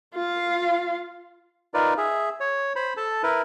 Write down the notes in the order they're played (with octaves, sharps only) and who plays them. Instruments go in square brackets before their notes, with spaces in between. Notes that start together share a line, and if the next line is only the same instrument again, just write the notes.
[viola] F4 F5
[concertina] D#4 F4 A#4 B4 D5
G#4 E5
C#5
C5 B5
A4 A5
E4 A#4 B4